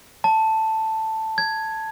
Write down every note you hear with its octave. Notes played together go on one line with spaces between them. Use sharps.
A5
G#6